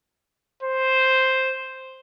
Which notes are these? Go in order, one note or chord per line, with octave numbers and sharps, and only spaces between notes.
C5